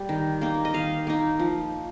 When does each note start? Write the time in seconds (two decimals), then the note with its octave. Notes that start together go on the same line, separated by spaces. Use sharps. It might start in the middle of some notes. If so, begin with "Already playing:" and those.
Already playing: G3
0.09 D#3
0.41 A#3 D#4
0.65 D#5
0.74 D#3 F5
1.07 A#3 D#4
1.39 F3